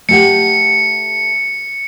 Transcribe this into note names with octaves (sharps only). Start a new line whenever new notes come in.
A3 G4 F#5 C#7